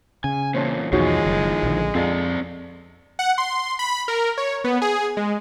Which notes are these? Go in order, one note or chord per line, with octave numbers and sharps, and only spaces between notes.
C#3 G#5
E2 A#2 C5 C#5 A5
B1 E2 D#3 F3 G#3 D#4 F#4 C#5
F#1
A#1 D3
F2 C4 F4 A4 D5
F#5
C6
B5
A#4
C#5
B3
G#4
G#3